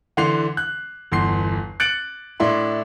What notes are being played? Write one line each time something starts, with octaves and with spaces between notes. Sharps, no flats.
D3 E3 F#5 C6 C7 F7
F#6
G1 E2 C6 C7
F#6 A6 C#7 D7 F#7
A2 D4 E4 C6